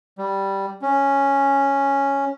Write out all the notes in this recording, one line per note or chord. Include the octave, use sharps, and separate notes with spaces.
G3
C#4